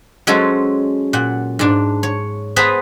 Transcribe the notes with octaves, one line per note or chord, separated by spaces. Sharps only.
F#3 G#3 C#4 A4 C5
A#2 F#5
G#2 D4
C#5
B3 G#4 B4 C5 A5 A#5